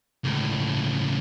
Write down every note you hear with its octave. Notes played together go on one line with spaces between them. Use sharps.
C#2 A2